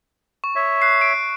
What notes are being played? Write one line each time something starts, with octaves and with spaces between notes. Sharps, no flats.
C#6
C#5 E5
F#6 C7
D7